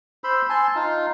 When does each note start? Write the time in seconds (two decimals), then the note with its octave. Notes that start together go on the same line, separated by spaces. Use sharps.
0.24 C5 B5 C6 E6
0.50 G#5 A5 C6 E6
0.75 D#4 F4 F5